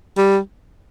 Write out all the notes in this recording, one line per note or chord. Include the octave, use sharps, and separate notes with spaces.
G3